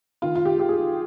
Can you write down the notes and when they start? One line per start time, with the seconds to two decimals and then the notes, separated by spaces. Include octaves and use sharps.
0.22 D#3 F4
0.35 F4
0.45 G4
0.57 G#3 G4
0.69 G#4